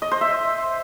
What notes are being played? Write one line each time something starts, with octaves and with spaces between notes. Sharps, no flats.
D#5
C5
E5